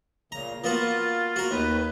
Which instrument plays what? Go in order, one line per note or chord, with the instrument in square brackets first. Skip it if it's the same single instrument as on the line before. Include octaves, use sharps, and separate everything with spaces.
[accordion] A#2 C#3 [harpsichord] A#5
[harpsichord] A#3 B3 F#4 [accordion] F4
[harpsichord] F#4 A#4
[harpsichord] D#2 [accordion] D#3 B4